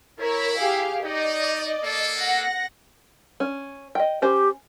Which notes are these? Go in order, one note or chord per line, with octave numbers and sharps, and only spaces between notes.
E4 A#4 C#5
G4 G#4 F5
D#4 D5 D#5
A#3 A4
F#5 A#6
C#4
D#5 G5
C#4 G4 C5